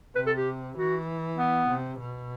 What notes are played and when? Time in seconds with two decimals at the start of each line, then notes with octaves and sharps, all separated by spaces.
0.16 C3 B4
0.26 A4
0.37 G4
0.77 E3 F#4
1.38 B3
1.69 C3
1.99 B2